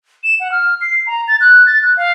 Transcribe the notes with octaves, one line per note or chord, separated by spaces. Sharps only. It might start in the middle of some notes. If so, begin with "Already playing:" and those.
E7
F#5
F6
C7
A#5
A6
F#6
A6
F#6
F5